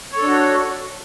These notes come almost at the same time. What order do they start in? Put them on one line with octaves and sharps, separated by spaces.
C#5 A4 D4 F#4